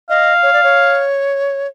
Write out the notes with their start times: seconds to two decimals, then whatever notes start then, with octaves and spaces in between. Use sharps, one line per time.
0.09 D#5 F5
0.43 C#5
0.53 D5
0.64 C#5